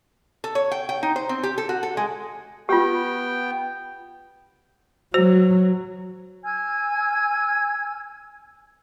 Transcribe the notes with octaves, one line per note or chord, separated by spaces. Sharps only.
A4
C#5
G5
G5
D#4
C5
C4
G4
A4
F#4
A4
G#3
B3 F4 G4 G5
F#3 F#4 C5
G#5 E6 F6 G#6